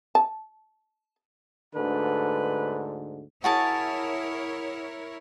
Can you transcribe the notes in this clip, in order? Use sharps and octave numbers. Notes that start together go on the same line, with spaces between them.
A5
D2 G#2 D3 B4
E4 F#4 G#4 A#4 C#5 A5